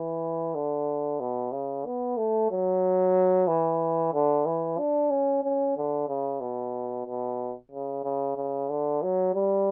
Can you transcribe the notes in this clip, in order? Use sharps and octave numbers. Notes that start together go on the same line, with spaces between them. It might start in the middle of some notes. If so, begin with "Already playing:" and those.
Already playing: E3
D3
B2
C#3
B3
A3
F#3
E3
D3
E3
D4
C#4
C#4
D3
C#3
B2
B2
C#3
C#3
C#3
D3
F#3
G3